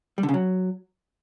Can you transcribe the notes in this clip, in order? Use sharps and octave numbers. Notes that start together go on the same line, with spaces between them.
G3
D3
C#3
F#3